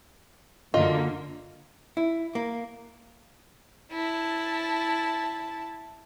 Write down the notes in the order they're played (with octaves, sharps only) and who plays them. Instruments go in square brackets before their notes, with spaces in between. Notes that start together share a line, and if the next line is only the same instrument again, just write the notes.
[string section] F#2 D3 A#3 [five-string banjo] F4 D#5
[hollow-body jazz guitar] E4
A#3
[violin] E4 A5